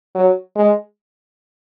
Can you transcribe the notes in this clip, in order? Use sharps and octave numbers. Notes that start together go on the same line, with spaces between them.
F#3
G#3